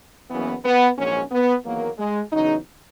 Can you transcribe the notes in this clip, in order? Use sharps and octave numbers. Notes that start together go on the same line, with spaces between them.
F#1 E2 C#3 E3 B3
B3
A#1 G#2 F#3 C#4
B3
E2 D#3 F#3 A#3
G#3
E2 C#3 F#3 D#4